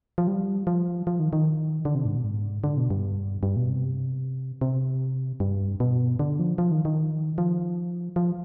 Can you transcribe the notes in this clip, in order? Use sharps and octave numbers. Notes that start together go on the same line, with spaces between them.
F3
G3
F3
F3
D#3
D#3
D3
C3
G#2
B2
G#2
D3
B2
G2
G2
B2
C3
C3
G2
B2
D3
F3
F3
D#3
D#3
F3
F3